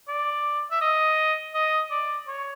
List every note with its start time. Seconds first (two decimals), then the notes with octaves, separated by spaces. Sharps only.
0.08 D5
0.71 E5
0.81 D#5
1.54 D#5
1.90 D5
2.27 C#5